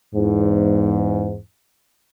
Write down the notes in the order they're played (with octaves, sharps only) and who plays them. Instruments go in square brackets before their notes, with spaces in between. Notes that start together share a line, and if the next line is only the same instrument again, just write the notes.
[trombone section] E2 G#2